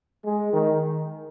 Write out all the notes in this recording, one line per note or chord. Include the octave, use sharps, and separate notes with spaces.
G#3
D#3